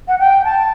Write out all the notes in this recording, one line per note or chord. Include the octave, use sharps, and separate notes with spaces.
F#5
G5
A5